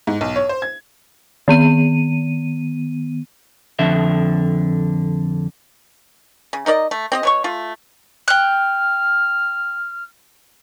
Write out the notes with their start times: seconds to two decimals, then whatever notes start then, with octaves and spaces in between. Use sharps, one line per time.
0.07 G#2
0.21 B1
0.36 C#5
0.49 C5
0.62 G#6
1.48 D#3 B3 D#7
3.79 F2 D3 E5
6.53 C#3
6.66 D#4 A#4 D5 D#5
6.91 A3
7.12 C4 G4 D#5
7.23 B2 C#5 C#6
7.44 A3 F4
8.28 G5 F6 F#6